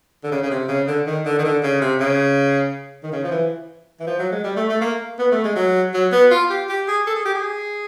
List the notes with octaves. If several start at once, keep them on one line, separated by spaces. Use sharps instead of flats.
D3
C#3
C#3
C3
C#3
D3
D#3
D3
D#3
D3
C#3
C3
C#3
D#3
C#3
F3
E3
E3
F3
F#3
G#3
G3
A3
A3
A#3
B3
A3
G#3
F#3
F#3
B3
F4
G4
G4
G#4
A4
G#4
G4
G#4